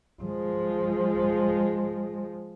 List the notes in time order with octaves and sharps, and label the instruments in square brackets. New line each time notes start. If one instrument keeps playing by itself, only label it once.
[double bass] F3 G#3